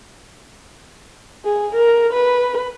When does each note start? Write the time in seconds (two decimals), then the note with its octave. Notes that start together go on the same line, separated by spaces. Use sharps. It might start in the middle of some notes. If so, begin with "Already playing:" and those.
1.45 G#4
1.75 A#4
2.13 B4